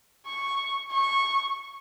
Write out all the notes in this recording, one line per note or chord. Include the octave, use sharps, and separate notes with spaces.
C#6
C#6